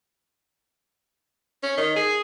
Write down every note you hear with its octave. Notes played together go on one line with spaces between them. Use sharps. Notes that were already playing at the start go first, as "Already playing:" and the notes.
C#4
D#3
G#4